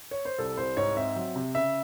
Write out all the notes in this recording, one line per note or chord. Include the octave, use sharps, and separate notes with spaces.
C#5
C5
C2 A4
C2 C5
G#2 C#5
C4 E5
F#3
C3
C#3 E5